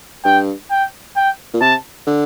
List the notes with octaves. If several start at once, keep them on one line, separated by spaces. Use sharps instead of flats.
G2 G5
G5
G5
A#2
C3 A5
D3